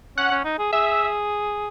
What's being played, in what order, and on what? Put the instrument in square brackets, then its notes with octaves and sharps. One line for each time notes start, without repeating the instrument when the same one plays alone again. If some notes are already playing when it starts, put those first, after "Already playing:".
[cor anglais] C#4 [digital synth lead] F#5
[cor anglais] C#4
D#4
G#4
[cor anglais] G#4 [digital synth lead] E5